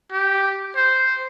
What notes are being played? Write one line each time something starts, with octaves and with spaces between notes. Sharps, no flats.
G4
C5